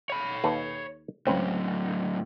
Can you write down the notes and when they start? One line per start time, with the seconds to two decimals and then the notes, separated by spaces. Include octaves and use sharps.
0.10 C#5 B5
0.44 D#2 A4 B4
1.27 C#2 A2 F#3 C4